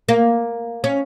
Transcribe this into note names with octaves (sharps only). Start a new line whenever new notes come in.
A#3
C#4